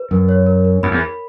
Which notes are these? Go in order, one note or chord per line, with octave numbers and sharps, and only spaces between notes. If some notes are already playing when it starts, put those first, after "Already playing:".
Already playing: B4
F#2 A#4
C#5
A#4
A#4
F#2 B5
E2
B5